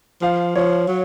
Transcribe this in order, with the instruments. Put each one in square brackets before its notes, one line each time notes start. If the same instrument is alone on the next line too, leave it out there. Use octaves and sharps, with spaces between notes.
[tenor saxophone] F3 [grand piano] F5
[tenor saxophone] F3 [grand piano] C#5
[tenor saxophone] F#3